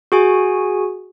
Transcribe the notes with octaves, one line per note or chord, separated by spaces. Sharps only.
F#4 G#4 G#5